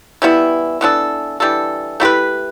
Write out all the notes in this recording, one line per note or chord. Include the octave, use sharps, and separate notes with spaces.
E3 G3 B3 E4
E3 B3 D4 A4
E3 G3 D4 A4
A3 E4 G4 B4